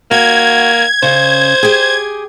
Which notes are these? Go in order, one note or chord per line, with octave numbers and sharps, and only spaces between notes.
A#3 F#4 G#6
C#3 C5
G4 G#4